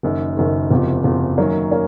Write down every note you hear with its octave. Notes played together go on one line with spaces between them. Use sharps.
F#1 F#2 D#3
F#1 F#2 D#3
F#1 E2 C3 F3
F#1 E2 C3 F3
F#2 D#3 F#3 A#3 C#4
A#3 C#4